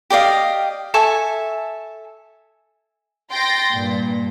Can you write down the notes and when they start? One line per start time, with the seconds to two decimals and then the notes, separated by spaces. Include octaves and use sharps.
0.10 G4 D5 D#5 F5
0.94 A4 E5 G#5 C#6
3.31 G5 C6 A6 A#6
3.73 G2 A#2